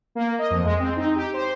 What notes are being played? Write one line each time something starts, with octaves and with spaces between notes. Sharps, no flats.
A#3
D#5
F2
G#3
C4
D#4
G4
C5